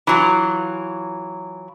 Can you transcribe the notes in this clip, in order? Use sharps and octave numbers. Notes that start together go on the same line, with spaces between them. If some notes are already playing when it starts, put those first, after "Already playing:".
E3 F#3 F4